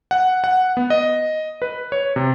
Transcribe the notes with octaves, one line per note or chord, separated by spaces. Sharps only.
F#5
F#5
B3
D#5
B4
C#5
C3